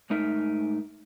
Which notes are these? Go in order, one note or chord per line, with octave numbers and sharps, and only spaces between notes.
G#2 A3 D#4 A#4 E5